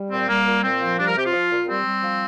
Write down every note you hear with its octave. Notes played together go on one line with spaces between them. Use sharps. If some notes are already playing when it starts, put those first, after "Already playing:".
Already playing: G3
A#2 C4
G3 A#3
A#2
A#2 C4
F3
G3 D4
A#4
C3 G4
F4
F3
A#2
G3 C4
G3
F3